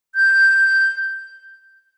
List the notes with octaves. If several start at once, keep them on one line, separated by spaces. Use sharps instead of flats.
G6